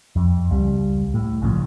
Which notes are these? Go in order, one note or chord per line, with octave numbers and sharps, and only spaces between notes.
F2
C#2 G3
A2
A#1 G#2 C#3 F3